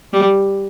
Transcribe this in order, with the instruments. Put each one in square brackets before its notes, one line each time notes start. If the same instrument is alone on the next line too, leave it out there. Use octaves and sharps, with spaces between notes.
[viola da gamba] G3